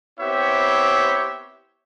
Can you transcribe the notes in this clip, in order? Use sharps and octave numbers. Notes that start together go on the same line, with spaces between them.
B3 C4 E4 G4 C#5 E5